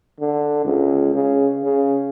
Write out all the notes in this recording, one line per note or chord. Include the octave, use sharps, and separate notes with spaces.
D3
C#2
C#3
C#3